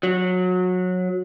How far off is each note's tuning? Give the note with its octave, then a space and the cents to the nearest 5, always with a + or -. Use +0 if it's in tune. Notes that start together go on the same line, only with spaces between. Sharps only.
F#3 -20